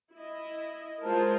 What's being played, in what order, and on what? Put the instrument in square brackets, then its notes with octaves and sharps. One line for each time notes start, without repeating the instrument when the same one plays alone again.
[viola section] E4 D#5
[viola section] G#3 F4 A#4 [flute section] C5 A5